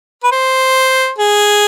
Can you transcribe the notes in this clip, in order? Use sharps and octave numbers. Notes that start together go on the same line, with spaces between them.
B4
C5
G#4